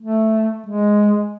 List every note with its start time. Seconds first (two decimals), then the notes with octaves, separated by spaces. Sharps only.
0.01 A3
0.67 G#3